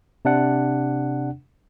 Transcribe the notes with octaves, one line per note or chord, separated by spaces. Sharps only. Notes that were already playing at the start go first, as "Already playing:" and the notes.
C3 D4 F#5